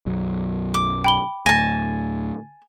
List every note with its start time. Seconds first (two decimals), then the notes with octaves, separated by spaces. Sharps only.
0.06 B1 F#2 F#3
0.74 D6
1.04 G5 B5 G7
1.46 D2 A2 G#5 A5 A#6